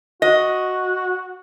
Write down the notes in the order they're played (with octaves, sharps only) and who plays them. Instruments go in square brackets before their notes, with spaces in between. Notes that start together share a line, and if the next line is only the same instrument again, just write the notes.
[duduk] F#4 [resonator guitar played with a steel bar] D#5